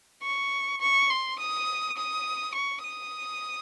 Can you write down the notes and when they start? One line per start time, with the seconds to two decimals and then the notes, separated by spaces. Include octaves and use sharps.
0.23 C#6
0.81 C#6
1.10 C6
1.39 D#6
1.97 D#6
2.55 C#6
2.83 D#6